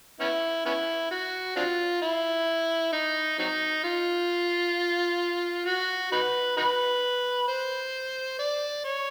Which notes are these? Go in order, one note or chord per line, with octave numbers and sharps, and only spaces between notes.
B3 C#4 E4
B3 C#4 E4
F#4
C4 D4 F4
E4
D#4
F#3 C4 D#4
F4
F#4
D#4 F#4 B4
D#4 F#4 B4
C5
D5
C#5